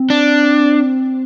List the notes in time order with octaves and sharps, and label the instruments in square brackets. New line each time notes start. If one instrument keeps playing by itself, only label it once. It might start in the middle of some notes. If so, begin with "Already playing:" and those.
Already playing: [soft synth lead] C4
[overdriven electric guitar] D4